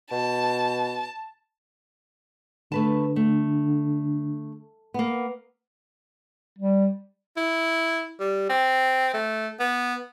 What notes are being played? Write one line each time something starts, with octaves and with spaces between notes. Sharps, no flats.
B2 A5
D3 A3 B4 A5
A3
A#3 B3
G3
E4
G3
C4
A3
B3